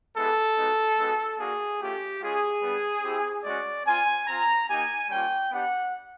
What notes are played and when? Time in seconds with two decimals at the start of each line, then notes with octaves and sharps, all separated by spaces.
0.15 G#3 B3 E4 G4 A4
0.56 G#3 B3 D#4 F#4
0.97 G#3 B3 D#4 F#4
1.38 A#3 D4 F#4 G#4
1.80 A3 C#4 F4 G4
2.20 G#3 C#4 F4 G#4
2.62 G3 B3 D4
3.03 C4 E4 G4
3.44 G#3 C#4 F#4 D5
3.85 C4 F4 G#5
4.26 C4 F4 A#5
4.67 A#3 D#4 G4 G#5
5.09 G3 A#3 C#4 F4 G5
5.50 B3 D4 G4 F#5